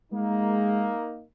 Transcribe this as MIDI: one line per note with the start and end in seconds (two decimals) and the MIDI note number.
0.12 0.93 56
0.12 1.23 58
0.12 1.23 63